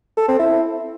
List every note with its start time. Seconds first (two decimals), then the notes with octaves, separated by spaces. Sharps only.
0.17 A4
0.28 C4
0.39 E4